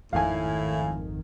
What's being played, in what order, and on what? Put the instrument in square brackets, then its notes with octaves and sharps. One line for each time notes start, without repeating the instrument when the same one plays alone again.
[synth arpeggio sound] G#1 F2 D#3 [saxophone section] A2 E4 [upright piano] F5 G#5